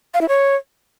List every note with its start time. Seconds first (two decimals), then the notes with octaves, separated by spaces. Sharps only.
0.14 F5
0.21 E4
0.29 C#5